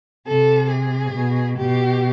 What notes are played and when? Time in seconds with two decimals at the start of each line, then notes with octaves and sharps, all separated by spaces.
0.27 C3 A4
0.70 G#4
1.13 B2
1.56 B2 G4